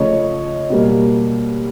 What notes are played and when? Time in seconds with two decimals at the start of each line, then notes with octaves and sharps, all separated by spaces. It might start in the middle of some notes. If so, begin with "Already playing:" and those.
Already playing: C#3 F3 A3 C#5 D#5
0.70 B2 G3 A#3